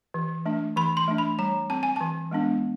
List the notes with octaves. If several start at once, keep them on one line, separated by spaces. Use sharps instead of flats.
E3
A3 D4
E3 B5
C6
A3 D4
B5
G3 A#5
C4 A5
G#5
E3 A5
G#3 B3 D4